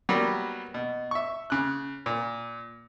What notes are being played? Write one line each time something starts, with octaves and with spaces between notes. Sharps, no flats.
F#3 G3 A#3 B3
B2
E5 C#6
C#3 F#6
A#2